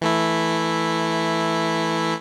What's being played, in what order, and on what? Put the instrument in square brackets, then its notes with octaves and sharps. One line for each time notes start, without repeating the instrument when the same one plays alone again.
[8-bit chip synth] E3 A3 E4